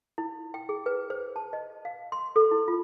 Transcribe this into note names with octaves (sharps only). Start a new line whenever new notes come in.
E4
G5
G#4
B4
C5
A5
D#5
F5
C6
A4
E4
F4